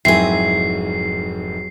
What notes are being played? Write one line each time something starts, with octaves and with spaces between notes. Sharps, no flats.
F1 G#2 F#3 C4 E4 G#4 A#4 C7